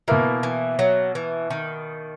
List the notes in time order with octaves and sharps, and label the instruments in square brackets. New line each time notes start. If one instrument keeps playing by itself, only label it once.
[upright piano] B2 A#3 E4 A#4 [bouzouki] E3
[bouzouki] E3
F#3
E3
D#3